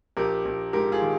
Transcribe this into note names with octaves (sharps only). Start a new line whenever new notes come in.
A#1 G4 A#4
A#1
G#2 G4 A#4
F4 G#4
D#3